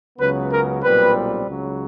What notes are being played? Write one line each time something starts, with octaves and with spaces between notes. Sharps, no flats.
C#2 C#3 F#3 B3 B4
A#4
B1 A#2 G3 C4 B4
C#2 C#3 F#3